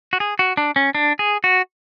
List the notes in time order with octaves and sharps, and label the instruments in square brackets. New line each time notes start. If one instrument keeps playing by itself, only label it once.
[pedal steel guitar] F#4
G#4
F#4
D4
C#4
D4
G#4
F#4